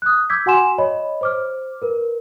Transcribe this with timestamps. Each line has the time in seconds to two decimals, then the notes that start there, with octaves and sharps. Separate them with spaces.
0.02 D#6 F#6
0.30 D6 E6 G6 G#6 B6
0.46 F#4 F#5 G#5 C6 E7
0.78 C#5 D#5 B5
1.21 C5 D6 F6
1.82 A#4 B4